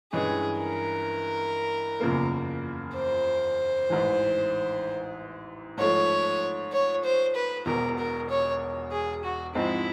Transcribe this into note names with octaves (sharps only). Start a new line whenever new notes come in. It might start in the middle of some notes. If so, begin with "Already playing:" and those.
G2 E3 G#3 C#4 G#4
A#4
F#1 E2 C#3 F3 A#3
C5
A1 G#2 E3
G#2 F3 A3 C#5
C#5
C5
B4
E1 E2 B2 A#4
A#4
C#5
G#4
F#4
G#2 F3 G#3 C4 E4